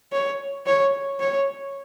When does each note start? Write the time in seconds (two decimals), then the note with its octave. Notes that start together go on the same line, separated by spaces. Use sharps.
0.12 C#5
0.66 C#5
1.20 C#5